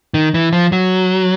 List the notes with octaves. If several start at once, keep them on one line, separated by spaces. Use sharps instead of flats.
D#3
E3
F3
F#3